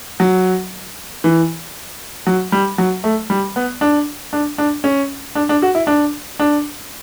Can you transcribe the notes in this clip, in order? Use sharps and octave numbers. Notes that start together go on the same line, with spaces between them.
F#3
E3
F#3
G3
F#3
A3
G3
B3
D4
D4
D4
C#4
D4
D4
F#4
E4
D4
D4